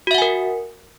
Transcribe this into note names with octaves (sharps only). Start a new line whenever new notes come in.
F#4 A#4 E5 F#5 G#5